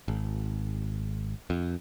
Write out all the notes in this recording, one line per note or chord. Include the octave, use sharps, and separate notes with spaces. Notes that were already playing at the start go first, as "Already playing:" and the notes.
G#1
F2